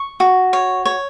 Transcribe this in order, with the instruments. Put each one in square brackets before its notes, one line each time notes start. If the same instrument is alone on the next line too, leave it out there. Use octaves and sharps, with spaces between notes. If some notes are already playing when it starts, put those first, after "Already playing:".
Already playing: [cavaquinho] C#6
F#4
C#5
C#5